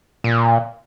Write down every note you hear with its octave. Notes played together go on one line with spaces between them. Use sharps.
A#2